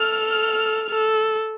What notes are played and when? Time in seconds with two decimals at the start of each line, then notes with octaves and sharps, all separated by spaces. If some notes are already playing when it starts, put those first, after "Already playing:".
Already playing: A4 F6
0.90 A4